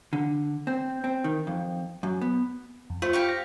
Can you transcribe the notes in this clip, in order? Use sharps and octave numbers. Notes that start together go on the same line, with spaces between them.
D3
C4
C4
D#3
F2
F#2
B3
F2
A3 F4 C5
G4 F5 C#6
A#6